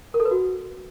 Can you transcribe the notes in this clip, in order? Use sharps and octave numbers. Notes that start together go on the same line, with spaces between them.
A#4
A4
B4
F#4